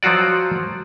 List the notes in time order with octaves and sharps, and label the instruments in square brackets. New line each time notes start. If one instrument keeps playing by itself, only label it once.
[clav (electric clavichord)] F3 F#3 F4 F#4 D5